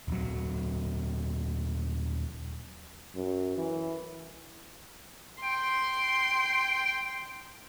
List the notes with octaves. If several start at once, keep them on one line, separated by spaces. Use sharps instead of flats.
D#1 F#3
F#2
E3
G5 C6